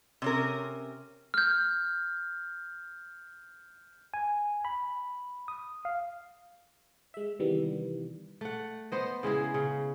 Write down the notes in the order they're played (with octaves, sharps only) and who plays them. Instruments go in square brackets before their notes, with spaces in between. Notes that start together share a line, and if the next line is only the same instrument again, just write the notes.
[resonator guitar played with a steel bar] C3 C#4 A#4
[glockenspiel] F6 G6
[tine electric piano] G#5
B5
D#6
F5
[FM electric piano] G#3 E5
C3 D#3 E3 G3 B3
[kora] A3 F#5
B3 C5 D#5
C#3 G#3 E4 G#4
C#3